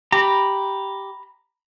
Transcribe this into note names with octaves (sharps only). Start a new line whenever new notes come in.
G4 A#5 B5